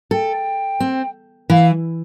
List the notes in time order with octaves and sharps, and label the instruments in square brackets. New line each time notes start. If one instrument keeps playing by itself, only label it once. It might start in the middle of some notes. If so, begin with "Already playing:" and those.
[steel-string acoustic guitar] A4 [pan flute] G5
[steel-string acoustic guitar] C4
[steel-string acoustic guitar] E3 [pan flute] F5